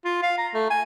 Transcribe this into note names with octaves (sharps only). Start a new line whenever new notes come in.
F4
F5
A#5
A3
G#5